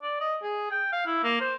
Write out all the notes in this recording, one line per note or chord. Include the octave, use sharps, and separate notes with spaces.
D5
D#5
G#4
G5
F5
E4
A#3
C5